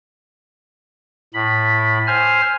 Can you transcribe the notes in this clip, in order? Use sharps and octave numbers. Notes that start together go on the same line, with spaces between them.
A2 B5
C5 G#5 F6